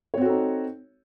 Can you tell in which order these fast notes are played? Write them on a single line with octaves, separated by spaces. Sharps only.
C#5 C4 F#4 A4 D#4